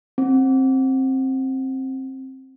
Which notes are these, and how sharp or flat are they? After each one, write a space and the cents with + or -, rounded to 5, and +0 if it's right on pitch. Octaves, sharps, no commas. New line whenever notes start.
C4 +15